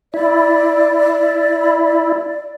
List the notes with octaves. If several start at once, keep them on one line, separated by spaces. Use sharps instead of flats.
E4 D5